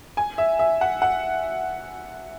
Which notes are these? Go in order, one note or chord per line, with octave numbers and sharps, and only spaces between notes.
G#5
E5
E5
F#5
F#5